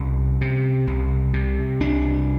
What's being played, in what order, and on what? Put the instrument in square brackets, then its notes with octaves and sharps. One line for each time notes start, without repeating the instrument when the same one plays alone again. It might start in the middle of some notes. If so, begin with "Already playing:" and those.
Already playing: [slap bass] C2 C#4
C3
C2
C3
C2 D4